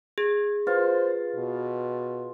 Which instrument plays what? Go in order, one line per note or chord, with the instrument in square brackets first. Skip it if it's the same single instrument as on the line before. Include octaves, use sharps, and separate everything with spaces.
[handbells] G#4 [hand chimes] G#6
[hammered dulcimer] F4 [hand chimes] B4 [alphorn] C5
[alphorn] B2